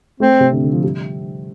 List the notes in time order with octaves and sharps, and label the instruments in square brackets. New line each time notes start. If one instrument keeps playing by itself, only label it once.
[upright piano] A3 [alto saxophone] C4
[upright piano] C3
D3
D3
F3
G3